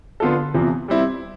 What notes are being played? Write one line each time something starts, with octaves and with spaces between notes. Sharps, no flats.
D3 F3 B3 F4 A4
E2 C3 F3
G3 C4 E4